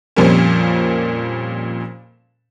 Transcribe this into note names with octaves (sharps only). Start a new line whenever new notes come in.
F2 A#2 F3 G3 A#3 C#4